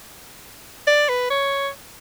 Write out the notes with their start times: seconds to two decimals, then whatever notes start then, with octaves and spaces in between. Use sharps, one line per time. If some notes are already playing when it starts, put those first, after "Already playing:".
0.87 D5
1.09 B4
1.31 C#5